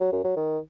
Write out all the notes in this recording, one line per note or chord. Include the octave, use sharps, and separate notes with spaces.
F#3
F#2
F#3
D#3